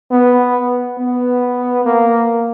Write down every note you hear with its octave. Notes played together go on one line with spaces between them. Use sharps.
B3
B3
A#3